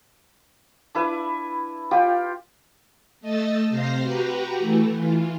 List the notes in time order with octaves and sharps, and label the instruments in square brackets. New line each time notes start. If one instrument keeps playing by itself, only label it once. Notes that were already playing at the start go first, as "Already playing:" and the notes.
[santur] D4 E4 B4
F4 G4 G5
[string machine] A3 D#5 E6 A6
C3 C5 F5 A#6 C7
F#4 G4 B4 A#5
E3 A3
E3 F4